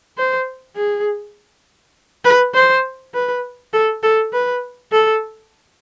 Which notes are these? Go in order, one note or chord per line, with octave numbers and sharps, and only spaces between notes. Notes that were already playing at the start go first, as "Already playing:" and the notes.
C5
G#4
B4
C5
B4
A4
A4
B4
A4